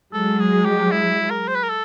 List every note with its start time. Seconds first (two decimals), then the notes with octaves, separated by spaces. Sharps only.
0.13 F#3 G#3 A4
0.39 G#4
0.65 G4
0.91 E4
1.31 A#4
1.48 C5
1.55 B4
1.63 A#4
1.69 A4